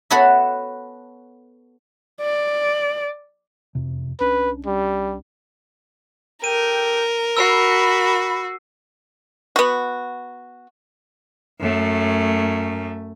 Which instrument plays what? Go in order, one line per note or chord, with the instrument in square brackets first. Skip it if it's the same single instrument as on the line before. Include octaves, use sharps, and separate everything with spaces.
[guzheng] B3 F#4 A4 B4 C#5 E5
[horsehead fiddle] D5
[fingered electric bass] E1 F2 C3
[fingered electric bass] C2 C#4 D4 [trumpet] B4
[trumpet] G3
[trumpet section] G4 A4 G5 [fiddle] A#4 [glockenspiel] D#7
[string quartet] F#4 [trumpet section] B5 [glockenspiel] E6 C7
[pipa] B3 F#4
[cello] F#2 A3